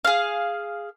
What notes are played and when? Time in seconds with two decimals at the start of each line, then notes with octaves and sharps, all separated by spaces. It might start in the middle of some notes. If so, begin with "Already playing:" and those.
0.05 G#4 F5